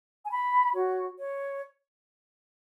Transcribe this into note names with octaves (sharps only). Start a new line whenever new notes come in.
G#5
B5
F#4 C#5
C#5